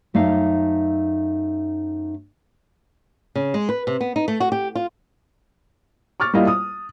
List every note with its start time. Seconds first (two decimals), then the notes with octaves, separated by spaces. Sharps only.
0.14 F#2 A3 D#4 F5
3.35 C#3
3.54 G#3
3.69 B4
3.87 C3
4.01 B3
4.16 D#4
4.28 A3
4.40 F#4
4.52 G4
4.75 F4
6.20 C#6 D6 F6 A6
6.33 G3 A#3 E4 F4 D#5 F5
6.47 D#6